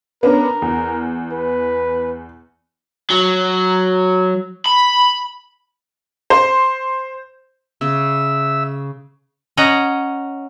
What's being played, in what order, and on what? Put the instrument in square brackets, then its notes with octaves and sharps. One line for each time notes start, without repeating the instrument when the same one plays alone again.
[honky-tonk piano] B3 C#4 D4 [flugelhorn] A#4
[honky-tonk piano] E2
[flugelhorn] B4
[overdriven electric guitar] F#3
B5
[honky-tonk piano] C5
[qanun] C#3 [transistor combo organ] E5 E6
[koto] C#4 D#5 F#5 A#5